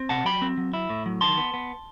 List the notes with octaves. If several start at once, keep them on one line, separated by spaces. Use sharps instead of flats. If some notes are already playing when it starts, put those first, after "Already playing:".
Already playing: C4
C3 F#5 A5
F#3 G5 B5
C4
F#3
E4
A2
F#3
D#3 A5 C6
B3
B3